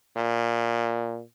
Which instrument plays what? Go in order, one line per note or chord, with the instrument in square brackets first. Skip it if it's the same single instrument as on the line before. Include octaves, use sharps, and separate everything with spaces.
[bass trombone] A#2